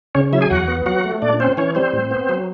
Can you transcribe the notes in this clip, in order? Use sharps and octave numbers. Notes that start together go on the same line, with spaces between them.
C#3 C#4 C#5
F#3 E4 E5
G#4 G#5
E2 F#4 F#5
B3
F#3 F#4 F#5
A3
A#2 D4 D5
C4 C#4 C5
E3 C#4 C#5
G3 C4 C5
A2
B3
F#3